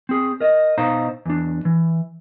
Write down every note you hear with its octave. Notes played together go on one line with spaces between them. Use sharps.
C4 G#4
A#4 D#5
B2 D#4 C5 F5 A#5
E2 D4
E3